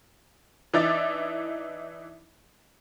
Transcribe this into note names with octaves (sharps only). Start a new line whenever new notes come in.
E3 D4 D#4 E5 D6 A6